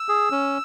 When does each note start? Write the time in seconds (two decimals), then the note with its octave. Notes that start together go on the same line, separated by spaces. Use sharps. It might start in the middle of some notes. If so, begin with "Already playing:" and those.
Already playing: E6
0.09 G#4
0.31 C#4